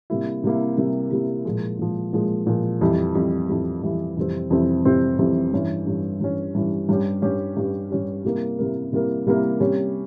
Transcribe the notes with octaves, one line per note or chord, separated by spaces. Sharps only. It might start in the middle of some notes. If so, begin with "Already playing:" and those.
C3 G3 A#3 E4
C3 G3 A#3 E4
C3 G3 A#3 E4
C3 G3 A#3 E4
A#2 F3 G#3
A#2 F3 G#3
A#2 F3 G#3
A#2 F3 G#3
F2 E3 G3
F2 E3 G3
F2 E3 G3
F2 E3 G3
F2 C3 E3 G3 C4
F2 C3 E3 G3 C4
F2 C3 E3 G3 C4
F2 C3 E3 G3 C4
G2 E3 G3 C#4
G2 E3 G3 C#4
G2 E3 G3 C#4
G2 E3 G3 C#4
G2 G3 C#4 G4
G2 G3 C#4 G4
G2 G3 C#4 G4
G2 G3 C#4 G4
C3 G3 A#3 E4 A#4
C3 G3 A#3 E4 A#4
C3 G3 A#3 E4 A#4
C3 G3 A#3 E4 A#4
C3 G3 C#4